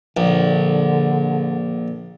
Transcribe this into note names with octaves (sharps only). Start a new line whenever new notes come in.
A#1 D3